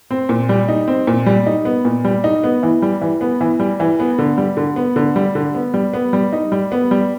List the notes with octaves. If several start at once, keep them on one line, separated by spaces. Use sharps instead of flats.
C4
A#2
G3
D#4
C4
A#2
G3
D#4
B3
A#2
G3
D#4
B3
E3
G3
E3
B3
E3
G3
E3
B3
D3
G3
D3
B3
D3
G3
D3
B3
G3
B3
G3
D#4
G3
B3
G3